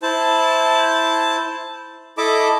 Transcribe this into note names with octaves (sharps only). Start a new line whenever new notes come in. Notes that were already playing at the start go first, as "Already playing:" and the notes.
E4 C5 A5
E4 A4 D#5 A5 B5 D6